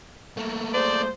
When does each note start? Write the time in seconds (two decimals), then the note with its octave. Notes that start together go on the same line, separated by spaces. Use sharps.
0.37 A3 A#3
0.73 F4 G#4 C5 D5